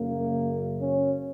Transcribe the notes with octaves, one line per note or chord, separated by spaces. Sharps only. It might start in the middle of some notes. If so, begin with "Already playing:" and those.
Already playing: F#2 C#3 A#3
C#4